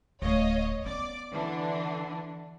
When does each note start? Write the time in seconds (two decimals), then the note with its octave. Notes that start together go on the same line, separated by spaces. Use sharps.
0.22 D1 A3 C#5 D#5 F5
0.86 B3 D5 D6
1.32 D3 E3 D4